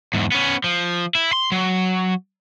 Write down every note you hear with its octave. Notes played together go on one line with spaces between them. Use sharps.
E2 G#2
B3 C#4
F3
E4
C6
F#3